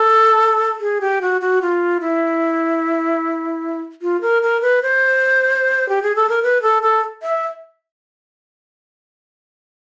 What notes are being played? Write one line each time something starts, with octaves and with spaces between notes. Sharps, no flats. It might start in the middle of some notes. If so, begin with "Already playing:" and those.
Already playing: A4
G#4
G4
F#4
F#4
F4
E4
F4
A#4
A#4
B4
C5
G4
G#4
A4
A#4
B4
A4
A4
E5